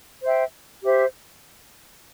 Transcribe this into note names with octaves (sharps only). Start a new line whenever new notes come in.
C5 E5 G5
G4 C5 E5